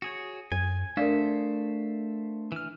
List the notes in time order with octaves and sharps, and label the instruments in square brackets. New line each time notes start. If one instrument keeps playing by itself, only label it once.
[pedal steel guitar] F#4 G#4 C#5
[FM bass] F#2 [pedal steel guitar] G#5 [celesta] G#6
[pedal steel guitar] A3 C5 E5 [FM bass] D4 [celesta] A#4 D5 F5
[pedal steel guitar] E3 F6